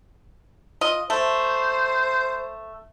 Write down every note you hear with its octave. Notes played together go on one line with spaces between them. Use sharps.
F4 D#5
A3 C5